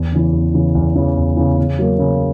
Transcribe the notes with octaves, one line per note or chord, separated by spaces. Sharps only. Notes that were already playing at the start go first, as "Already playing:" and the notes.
Already playing: E2
C#3 E3
E2
C#3 E3
E2
C#3 E3
E2
C#3 E3
C#3
F#3 A#3
C#3